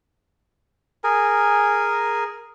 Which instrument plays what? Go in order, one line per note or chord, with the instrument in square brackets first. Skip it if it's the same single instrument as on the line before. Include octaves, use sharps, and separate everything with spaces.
[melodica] G#4 A#4 G#5